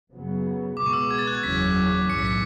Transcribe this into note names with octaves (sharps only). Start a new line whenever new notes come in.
F#2 C#3 F#3 B3
C#2 B2 G#3 B3 D6
C#6
E6
G#6
A6
F#6
G#6
F#1 E2 C#3 F#3 C#4 B6
B1 A2 E3 C#7
B6
C#7